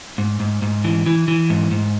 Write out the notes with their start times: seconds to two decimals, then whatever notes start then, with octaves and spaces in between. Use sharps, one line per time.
0.18 G#2
0.40 G#2
0.62 G#2
0.84 E3
1.06 E3
1.28 E3
1.50 G#2
1.71 G#2